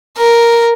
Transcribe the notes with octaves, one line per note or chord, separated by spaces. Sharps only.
A#4